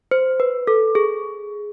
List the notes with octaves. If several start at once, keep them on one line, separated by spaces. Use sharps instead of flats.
C5
B4
A4
G#4